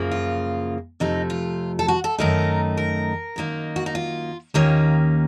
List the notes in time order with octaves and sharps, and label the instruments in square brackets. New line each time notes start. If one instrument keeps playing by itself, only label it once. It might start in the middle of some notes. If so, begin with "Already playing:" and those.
Already playing: [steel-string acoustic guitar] F#2 C#3 F3 A#3
F4
F2 C3 F3 A3 D#4
F4
A4
F#4
A4
F#2 D#3 A3 D#4 A#4
A#4
F#2 D#3 A#3 D#4
F#4
D#4
F4
D#2 D#3 A#3 C#4 F4